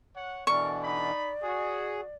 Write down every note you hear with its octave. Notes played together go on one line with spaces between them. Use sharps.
C#5 F#5
B2 D3 E3 A#4 D5 C#6
D#4 B5
F#4 G#4